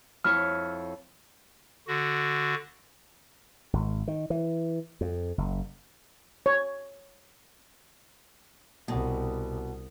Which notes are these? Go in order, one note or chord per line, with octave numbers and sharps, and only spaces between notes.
F2 E4 C#5 F6
D3 F#4
G#1
D#3
E3
F2
F#1
C#5
C2 B2